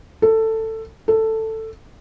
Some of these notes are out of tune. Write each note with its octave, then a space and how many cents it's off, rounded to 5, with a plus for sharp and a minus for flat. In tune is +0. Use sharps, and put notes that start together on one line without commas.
A4 +15
A4 +10